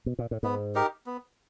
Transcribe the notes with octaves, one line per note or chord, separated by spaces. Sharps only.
B2
A#2
A2
G#2 B3
D#4 G4 A#4
B3